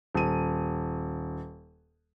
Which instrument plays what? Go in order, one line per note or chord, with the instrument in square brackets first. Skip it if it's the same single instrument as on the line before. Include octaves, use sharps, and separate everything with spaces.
[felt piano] D#1 D#7